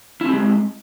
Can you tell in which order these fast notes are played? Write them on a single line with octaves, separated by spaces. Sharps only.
E4 C4 G4 G#3